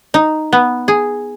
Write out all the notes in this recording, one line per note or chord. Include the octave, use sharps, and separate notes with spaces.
D#4
B3
G#4